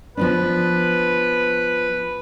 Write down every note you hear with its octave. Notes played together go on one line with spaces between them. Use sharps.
F3 B3 D4 B4